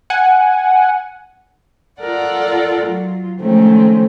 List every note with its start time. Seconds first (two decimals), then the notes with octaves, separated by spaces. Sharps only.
0.10 F#5 G#5
1.99 F4 A4 A#4 D5 F#5
2.82 F#3 F4
3.40 D#3 F3 G#3 A3 C4 C#4